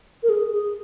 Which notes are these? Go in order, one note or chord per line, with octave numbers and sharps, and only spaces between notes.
A#4
G#4
G#4